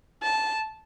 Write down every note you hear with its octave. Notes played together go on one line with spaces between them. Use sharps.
A5